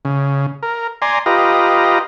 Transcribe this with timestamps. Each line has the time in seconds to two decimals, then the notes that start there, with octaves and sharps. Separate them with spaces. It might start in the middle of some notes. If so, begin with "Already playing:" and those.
0.05 C#3
0.63 A#4
1.02 D5 G#5 A#5 C6
1.26 F4 G4 B4 D#5 A#5